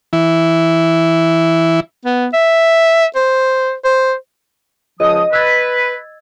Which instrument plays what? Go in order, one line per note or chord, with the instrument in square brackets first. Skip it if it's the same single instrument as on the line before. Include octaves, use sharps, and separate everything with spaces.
[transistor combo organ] E3 E4
[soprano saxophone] B3
E5
C5
C5
[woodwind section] C#2 F3 D#6 [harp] D#5
[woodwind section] B4 [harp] E6 G#6 A6